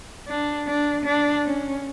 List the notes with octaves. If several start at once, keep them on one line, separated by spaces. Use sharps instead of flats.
D4
D4
D4
C#4